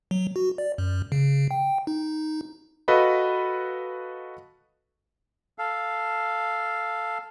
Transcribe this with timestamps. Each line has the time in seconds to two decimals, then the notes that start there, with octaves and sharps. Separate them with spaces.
0.11 F#3
0.36 F#4
0.58 D5
0.78 F#2
1.12 C#3
1.51 G5
1.87 D#4
2.88 F#4 A4 B4 D#5 F5 B5
5.58 A4 F5